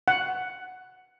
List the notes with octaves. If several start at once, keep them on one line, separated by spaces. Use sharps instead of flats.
F#5